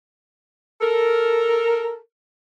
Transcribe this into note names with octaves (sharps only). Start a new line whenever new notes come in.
A4 A#4